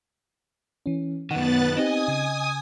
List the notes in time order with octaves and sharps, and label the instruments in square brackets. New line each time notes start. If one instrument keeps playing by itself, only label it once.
[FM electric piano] E3 C#4
[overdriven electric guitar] F#2 D#3 [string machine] B3 F#6 A6 [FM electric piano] F#5
[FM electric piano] C4 D#4 G4 [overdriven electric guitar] D#5 [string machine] G#5 D#6
[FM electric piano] C#3